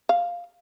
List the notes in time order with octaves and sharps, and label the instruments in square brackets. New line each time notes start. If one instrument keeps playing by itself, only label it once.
[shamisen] F5